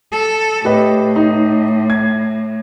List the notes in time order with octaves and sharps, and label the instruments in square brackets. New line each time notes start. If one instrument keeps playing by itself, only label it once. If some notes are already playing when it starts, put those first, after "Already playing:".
[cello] A4
[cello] A2 [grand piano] G4 B4 D#5
[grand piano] D#4
G#6